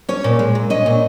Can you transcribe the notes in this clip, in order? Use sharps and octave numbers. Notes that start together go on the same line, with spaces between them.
C#4 C#5
A#2
G#3
A#2
C#4 D#5
A#2